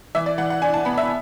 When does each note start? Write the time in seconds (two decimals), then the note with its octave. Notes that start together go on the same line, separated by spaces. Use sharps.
0.15 E3 E5
0.26 D5
0.38 E3 F#5
0.50 F#5
0.62 D4 G#5
0.74 A5
0.85 B3 B5
0.98 E5